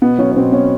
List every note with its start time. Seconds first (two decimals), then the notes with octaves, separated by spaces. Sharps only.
0.02 B2 B3
0.18 F#3 C#4
0.32 C#4
0.36 B2 C4
0.52 B2 C#4